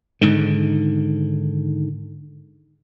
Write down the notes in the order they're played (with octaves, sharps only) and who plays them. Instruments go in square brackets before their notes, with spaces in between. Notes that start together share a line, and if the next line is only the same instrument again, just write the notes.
[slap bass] G#2 D3 D#3